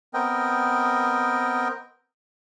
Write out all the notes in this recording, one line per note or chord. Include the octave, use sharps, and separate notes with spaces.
B3 C4 A#4 D#5 G5